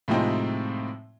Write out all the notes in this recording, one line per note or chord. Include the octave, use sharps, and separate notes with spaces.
A2 C3 F3 G#3 C4 D#4